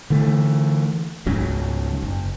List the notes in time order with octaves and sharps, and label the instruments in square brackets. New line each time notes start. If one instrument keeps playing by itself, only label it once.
[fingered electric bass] D3 E3 A3
C#2 G#2 C#3 F#3
F#1